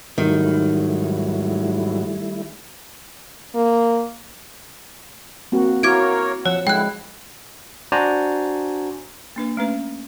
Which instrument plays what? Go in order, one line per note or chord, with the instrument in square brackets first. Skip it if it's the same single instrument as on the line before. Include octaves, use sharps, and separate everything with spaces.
[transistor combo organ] G#2 F#3 [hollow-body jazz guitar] D#3 [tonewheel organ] G3 A3 E4
[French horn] A#3
[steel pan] A#3 C4 F#4
[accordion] A#3 A#4 C#5 [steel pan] E4 F#4 [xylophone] D6 G#6 D7
[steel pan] F3 [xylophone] C#5 [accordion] F#5 E6
[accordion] D3 E4 [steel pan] G#3 [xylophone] G5 F#6
[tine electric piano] D4 F#4 C5 D5 G#5 A#5
[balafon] A#3 D4 B4
A3 C#4 B4